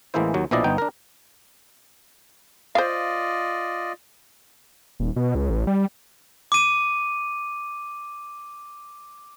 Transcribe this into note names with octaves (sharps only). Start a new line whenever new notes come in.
A1 E3 G#3 A#3 E4 C5
D#2 F#3
A#1 B2 F3 E4 D5 D#5
G1 B3 D#4 G5
D4 A#4
F4 C5 D5 D#5 F5
D#1
B2
C#2
A1
G3
D6 D#7